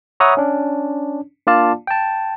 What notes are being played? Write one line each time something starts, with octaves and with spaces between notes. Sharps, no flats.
C#5 E5 F#5 A#5 B5 D#6
C#4 D4
A#3 D4 F4 D5 F5 A5
G5 A5